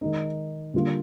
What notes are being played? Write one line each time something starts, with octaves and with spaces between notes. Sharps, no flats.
D#3 G#3 D#4
D3 G3 A#3 F4